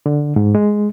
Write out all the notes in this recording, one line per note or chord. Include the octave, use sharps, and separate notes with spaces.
D3
G#2
G#3